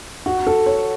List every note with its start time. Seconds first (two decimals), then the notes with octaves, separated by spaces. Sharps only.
0.26 F#4
0.47 A4
0.66 C#5